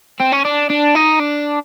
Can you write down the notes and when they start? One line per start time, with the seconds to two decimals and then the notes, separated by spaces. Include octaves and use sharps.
0.20 C4
0.32 C#4
0.45 D4
0.70 D4
0.95 D#4
1.20 D4